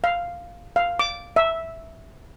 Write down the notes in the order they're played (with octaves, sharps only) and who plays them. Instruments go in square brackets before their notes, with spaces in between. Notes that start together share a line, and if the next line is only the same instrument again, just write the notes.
[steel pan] F5
F5
D6
E5